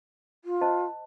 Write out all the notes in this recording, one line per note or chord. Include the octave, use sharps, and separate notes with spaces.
F4
C5 D#5 A5